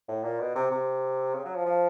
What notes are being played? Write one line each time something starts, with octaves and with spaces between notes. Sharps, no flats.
A2
A#2
B2
C3
C3
C#3
F#3
F3
F3